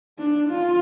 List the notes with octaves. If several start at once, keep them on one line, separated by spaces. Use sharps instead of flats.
D4
F4